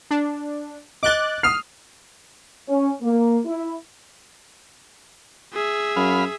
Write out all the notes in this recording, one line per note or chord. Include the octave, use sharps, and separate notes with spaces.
D4
D#5 D6 F#6 A6 G7
D#6 F6 C7
C#4
A#3
E4
G#4 E5
F#2 F5 B5